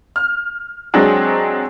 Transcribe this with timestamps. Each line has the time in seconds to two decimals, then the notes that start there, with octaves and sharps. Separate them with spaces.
0.16 F6
0.94 F#3 G#3 C4 D4 G#4